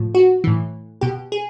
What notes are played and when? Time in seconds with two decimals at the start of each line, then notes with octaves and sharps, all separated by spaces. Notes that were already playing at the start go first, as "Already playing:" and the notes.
Already playing: A2 F3
0.15 F#4
0.44 A2 E3
1.01 B2 G4
1.32 G#4